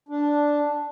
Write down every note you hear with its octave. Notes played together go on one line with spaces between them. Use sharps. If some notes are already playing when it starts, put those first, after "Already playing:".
D4